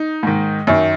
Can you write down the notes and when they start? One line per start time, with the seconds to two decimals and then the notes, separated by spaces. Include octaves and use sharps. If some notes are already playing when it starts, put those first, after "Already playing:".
Already playing: D#4
0.23 G#2 D#3
0.67 F#2 D#3